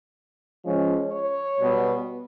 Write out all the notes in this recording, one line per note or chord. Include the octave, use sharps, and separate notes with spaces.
F3 G#3 C#4
C#5
B2 G3 B3